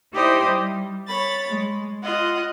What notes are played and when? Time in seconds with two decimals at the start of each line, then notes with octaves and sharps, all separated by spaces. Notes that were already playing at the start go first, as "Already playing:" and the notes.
0.13 D#4 E4 G4 C5 D5 D#5
0.48 G3
1.08 C#5 B5 A6
1.49 G#3
2.03 F4 D#5 F#5